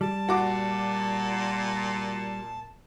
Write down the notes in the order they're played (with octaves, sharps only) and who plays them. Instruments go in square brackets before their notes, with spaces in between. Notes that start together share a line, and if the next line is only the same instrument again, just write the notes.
[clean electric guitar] G3 [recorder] A5
[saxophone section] A#2 [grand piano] F#4 D6